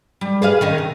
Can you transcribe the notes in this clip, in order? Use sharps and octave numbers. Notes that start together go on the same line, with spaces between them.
G3
G#4 B4 F5
D#3 C#4 D#4
C3